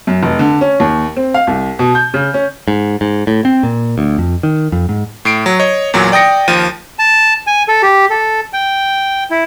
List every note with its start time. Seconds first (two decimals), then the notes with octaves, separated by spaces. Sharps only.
0.07 F#2
0.23 F1
0.39 D3
0.61 C#4
0.80 D#2
1.16 C4
1.34 F5
1.47 C2
1.79 B2
1.95 G6
2.14 C#3
2.34 C#4
2.68 G#2
3.01 G#2
3.27 A2
3.45 C4
3.63 A#2
3.98 D2
4.18 F2
4.43 D#3
4.72 F2
4.89 G#2
5.25 A2 C7 D7
5.46 F#3
5.60 C#5 D#5
5.94 E2 A#2 F#3
6.12 D5 G5 D#6 A#6 C#7
6.48 D#2 F3 D#7
6.99 A5
7.47 G#5
7.68 A4
7.83 G4
8.10 A4
8.53 G5
9.31 E4